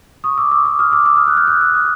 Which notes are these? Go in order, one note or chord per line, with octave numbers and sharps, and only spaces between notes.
C#6 D#6
D6 E6
D6 E6
D6 E6
D#6 F6
D6 E6
D6 E6
D#6 F6
E6 F#6
F6 G6
E6 F#6
E6 F#6
D#6 F6